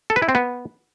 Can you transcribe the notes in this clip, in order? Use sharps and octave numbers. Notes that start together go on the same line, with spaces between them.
A4
B4
E4
C4
B3